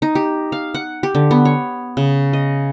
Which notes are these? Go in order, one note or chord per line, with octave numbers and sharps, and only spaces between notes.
D#4
G4
F5
F#5
G4
D3
B3
C#5
C#3
D#5